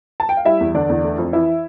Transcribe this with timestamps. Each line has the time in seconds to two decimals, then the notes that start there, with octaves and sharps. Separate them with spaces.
0.20 A5
0.29 G5
0.37 F5
0.45 G3 E4 E5
0.60 E2
0.75 D3 D4 D5
0.89 E2
1.04 A3
1.18 F2
1.33 E3 E4 E5